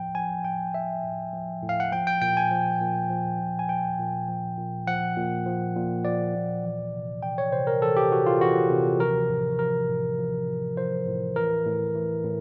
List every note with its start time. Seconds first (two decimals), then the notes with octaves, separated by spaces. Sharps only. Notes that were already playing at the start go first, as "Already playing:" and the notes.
Already playing: A2 F3 G5
0.15 F3 G#5
0.44 A2 G5
0.74 F3 E5
1.04 A2
1.33 F3
1.63 A2
1.69 F5
1.80 F#5
1.92 F3 G5
2.07 G5
2.22 A#2 G5
2.37 G#5
2.51 F3
2.81 A#2
3.10 F3
3.40 A#2
3.59 G#5
3.69 F3 G5
3.99 A#2
4.28 F3
4.58 A#2
4.87 F3 F#5
5.17 A#2
5.46 F3
5.76 A#2
6.05 F3 D5
6.35 A#2
6.63 E3
6.93 C3
7.23 E3 G5
7.38 C#5
7.52 C3 C5
7.67 A#4
7.82 E3 A4
7.97 G4
8.11 C3 F#4
8.26 F4
8.41 E3 F#4
8.70 C3
9.00 F3 A#4
9.30 A2
9.59 F3 A#4
9.88 A2
10.18 F3
10.47 A2
10.77 F3 C5
11.07 A2
11.36 E3 A#4
11.65 A2
11.95 E3
12.24 A2